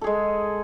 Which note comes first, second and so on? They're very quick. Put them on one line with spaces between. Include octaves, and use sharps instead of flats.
A4 G#4 G#3